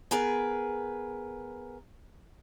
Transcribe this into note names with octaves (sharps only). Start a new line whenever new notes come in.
B3 G#4 A#4 B4